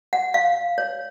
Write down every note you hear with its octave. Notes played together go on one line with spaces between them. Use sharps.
F#5
F5
C#5